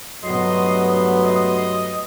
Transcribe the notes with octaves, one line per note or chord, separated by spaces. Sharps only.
G2 F#3 A3 B3 D#5 C6
D#5